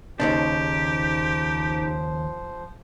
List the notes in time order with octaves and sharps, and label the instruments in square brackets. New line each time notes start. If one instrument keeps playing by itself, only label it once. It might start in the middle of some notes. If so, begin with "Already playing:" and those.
[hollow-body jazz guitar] D#2 C#3 D4 [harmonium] F3 C5 [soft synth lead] D#4 [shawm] G4